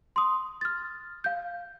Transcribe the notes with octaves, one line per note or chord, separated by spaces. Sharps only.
C6 D#6
F6 A6
F5 G6